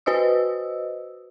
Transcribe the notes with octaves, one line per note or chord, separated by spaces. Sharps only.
F#4 B4 C5 D#5 D#6 E6